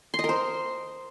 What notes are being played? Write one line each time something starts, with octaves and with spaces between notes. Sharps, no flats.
C6
D#5
A#4
C5